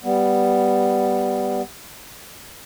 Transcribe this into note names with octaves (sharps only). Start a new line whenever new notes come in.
G3 B3